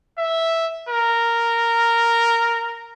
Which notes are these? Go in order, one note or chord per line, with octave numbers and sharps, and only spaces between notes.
E5
A#4